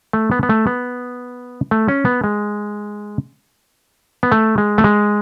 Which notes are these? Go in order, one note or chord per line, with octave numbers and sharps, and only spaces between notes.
A3
B3
B3
A3
B3
A3
C#4
B3
G#3
B3
A3
G#3
A3
G#3